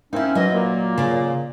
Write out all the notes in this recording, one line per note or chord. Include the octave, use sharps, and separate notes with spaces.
A#3 C4 C#4 D#4 E4
E3 F#3 D#5
A#2 A#3
C#3 D5